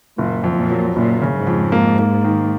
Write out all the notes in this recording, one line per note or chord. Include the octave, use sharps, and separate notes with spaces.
F#1 A#2
F2
A#2
F#3
F#1 A#2
C#3
G#2
F2
A#3
A#3
D#3